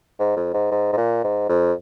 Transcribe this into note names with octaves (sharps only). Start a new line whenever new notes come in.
G#2
F2
G#2
G#2
G#2
A#2
G#2
F2